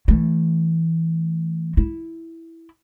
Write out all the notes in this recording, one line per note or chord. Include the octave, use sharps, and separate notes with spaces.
E3 A3
E4